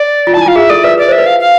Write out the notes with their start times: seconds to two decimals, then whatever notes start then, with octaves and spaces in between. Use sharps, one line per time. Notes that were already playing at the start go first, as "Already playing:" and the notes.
Already playing: D5
0.27 F4
0.34 A5
0.37 E4
0.41 G#5
0.46 F4 F5
0.55 G#4 E5
0.70 A4 D5
0.84 B4 E5
0.98 B4 D5
1.08 C5 E5
1.18 B4
1.26 F5
1.40 F5